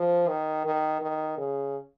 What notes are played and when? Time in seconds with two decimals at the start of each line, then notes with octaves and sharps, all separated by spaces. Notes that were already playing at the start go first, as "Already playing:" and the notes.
Already playing: F3
0.28 D#3
0.65 D#3
1.02 D#3
1.38 C#3